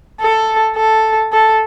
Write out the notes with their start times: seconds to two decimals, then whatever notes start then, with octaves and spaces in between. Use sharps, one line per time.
0.21 A4
0.76 A4
1.32 A4